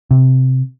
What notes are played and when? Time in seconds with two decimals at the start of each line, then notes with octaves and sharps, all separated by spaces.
0.11 C3